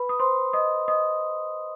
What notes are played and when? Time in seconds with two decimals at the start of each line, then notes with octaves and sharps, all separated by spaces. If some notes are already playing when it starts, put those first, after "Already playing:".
Already playing: B4 B5
0.09 D#6
0.20 C5 C6
0.53 D#5 D#6
0.88 D#5 D#6